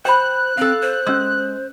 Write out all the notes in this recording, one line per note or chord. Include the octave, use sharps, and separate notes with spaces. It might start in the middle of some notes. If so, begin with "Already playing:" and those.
C5 G5 B5 F#6
C4 A4 F5
C5
G#3 C#4 E6